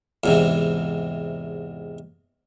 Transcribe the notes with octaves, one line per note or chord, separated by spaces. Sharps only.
E2 G#2 C3